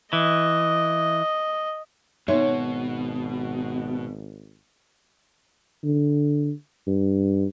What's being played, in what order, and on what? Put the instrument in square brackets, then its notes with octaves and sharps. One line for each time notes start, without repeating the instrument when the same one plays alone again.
[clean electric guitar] E3 [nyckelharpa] D#5
[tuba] G#1 [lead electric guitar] B2 [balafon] B3 D#4 E5 [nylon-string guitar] C#5
[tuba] D3
G2